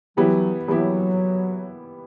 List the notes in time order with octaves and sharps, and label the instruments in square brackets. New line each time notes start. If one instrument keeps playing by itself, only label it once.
[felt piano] E3 G3 B3 E4 G4 [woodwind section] F#3
[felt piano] E3 G3 B3 E4 G4 [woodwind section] F#3